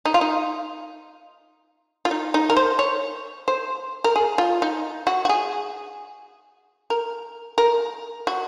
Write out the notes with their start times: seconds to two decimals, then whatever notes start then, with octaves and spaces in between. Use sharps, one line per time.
0.05 D#4
0.14 F4
0.21 D#4
2.05 F4
2.11 D#4
2.34 D#4
2.50 A#4
2.57 C5
2.79 C#5
3.48 C5
4.04 A#4
4.16 G#4
4.38 F4
4.62 D#4
5.07 F#4
5.25 F#4
5.29 G#4
6.90 A#4
7.58 A#4
8.27 F#4